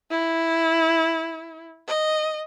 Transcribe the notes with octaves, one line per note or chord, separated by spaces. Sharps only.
E4
D#5